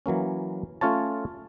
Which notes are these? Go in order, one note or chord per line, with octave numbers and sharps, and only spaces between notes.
E3 F#3 A#3 C#4
A3 C#4 F4 C#5 A5